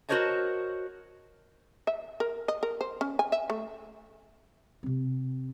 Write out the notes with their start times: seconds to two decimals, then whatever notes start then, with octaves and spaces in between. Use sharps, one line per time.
0.09 F#4 A#4 C5 C#5 D#5 A5
1.87 E5
2.20 A#4
2.48 D#5
2.63 A#4
2.81 C5
3.01 C#4
3.19 G#5
3.32 E5
3.50 A3
4.83 C3 C4